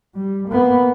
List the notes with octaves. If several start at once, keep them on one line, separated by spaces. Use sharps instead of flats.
G3
A#3 B3